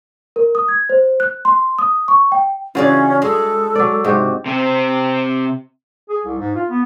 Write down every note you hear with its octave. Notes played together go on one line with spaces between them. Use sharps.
A#4
D#6
G#6
C5
F#6
C6
D#6
C#6
G5
C#3 E3 C#4 F4 F#4 G#4 D5
G#3 A4
F#3 D5
G#2 C3 F#4 G4
C3 C4
G#4
C2
G#2
F4
B3